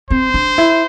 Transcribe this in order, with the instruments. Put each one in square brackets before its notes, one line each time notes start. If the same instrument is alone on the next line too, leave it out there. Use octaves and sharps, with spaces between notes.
[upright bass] C4 [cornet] C5
[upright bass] D4
E4